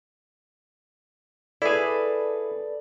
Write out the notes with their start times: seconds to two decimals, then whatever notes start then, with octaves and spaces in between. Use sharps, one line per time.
1.62 E4 G#4 A4 B4 D5